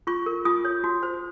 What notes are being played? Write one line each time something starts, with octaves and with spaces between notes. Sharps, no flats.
F4 C#6
A#4
F4 D#6
C#5
F#4
C5